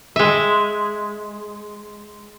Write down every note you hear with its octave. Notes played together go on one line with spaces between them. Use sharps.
G#3 E5